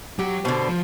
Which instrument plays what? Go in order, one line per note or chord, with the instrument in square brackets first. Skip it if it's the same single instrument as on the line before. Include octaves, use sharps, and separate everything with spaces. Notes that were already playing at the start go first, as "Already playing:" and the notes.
[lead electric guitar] F#3 [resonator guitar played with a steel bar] G4
[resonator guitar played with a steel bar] B2 D3 [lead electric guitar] C5
[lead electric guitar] F3